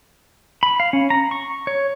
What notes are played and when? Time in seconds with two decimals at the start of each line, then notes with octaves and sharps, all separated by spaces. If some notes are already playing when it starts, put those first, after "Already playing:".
0.63 B5
0.80 F5
0.93 C#4
1.10 A#5
1.31 C#6
1.67 C#5